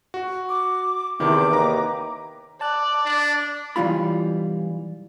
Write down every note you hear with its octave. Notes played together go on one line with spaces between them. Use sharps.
F#4
D6
E2 C3 D#3 E4 D6
D#2 B4 A#5
D5 A5 F#6
D4
B1 E3 G3 F4 B5